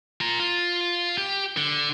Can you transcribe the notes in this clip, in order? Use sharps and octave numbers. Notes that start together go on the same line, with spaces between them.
F4 A#5
F4
G4
D3